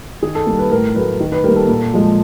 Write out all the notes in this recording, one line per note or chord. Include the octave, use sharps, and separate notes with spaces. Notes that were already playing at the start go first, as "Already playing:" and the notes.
D#3 G#4
A4
G3 A#3 A#4
B4
A2 A#4
F#3 A3 B4
D#3
B4
G3 A#3 A#4
A4
A#2
F3 G#3